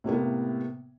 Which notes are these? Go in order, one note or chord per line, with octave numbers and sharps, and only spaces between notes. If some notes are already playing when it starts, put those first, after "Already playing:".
A2 C3 A#3 B3